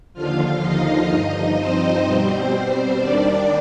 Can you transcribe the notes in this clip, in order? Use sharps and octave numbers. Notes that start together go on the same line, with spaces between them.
D#2 D3 F3 F4 F5
D#4 D#5
G2 F3 D#4 D#5
C4 C5
B2 G3 C4 C5
D#2 D#3 G3 D4 D5